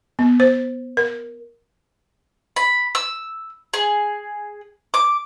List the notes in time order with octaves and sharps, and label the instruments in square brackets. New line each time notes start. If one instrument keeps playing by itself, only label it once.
[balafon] B3
C5
A#4
[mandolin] B5
E6
G#4
D6